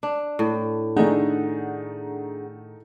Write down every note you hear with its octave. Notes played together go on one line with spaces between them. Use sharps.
D4
A2
D#3 A3 D4 D#4 G#4 F#5